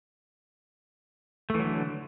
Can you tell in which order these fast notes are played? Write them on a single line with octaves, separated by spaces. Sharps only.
A3 E3 F#3 D3